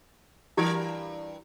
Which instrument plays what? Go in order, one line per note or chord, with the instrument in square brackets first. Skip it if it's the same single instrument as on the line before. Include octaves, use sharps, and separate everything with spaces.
[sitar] G2 E3 A#4 [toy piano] E4 G4